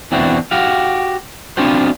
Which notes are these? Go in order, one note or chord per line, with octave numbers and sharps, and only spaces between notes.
E2 E3 C4 D4 F#4
F#4 G4 F5
B3 C4 D4 F4 F#4 C5